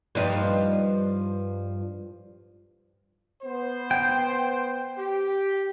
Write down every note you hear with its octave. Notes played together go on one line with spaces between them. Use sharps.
G2 F3 D#4
B3 C5
G5
G4